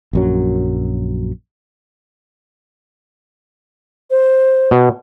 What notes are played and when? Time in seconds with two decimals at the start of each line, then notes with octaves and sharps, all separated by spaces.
0.13 A#1 F#2 F#3
4.11 C5
4.71 B2